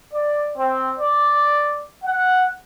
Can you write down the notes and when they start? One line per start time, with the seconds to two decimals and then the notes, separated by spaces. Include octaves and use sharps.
0.12 D5
0.58 C4
0.98 D5
2.04 F#5